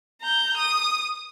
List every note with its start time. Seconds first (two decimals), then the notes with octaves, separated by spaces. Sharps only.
0.22 A#5 G6
0.57 D#6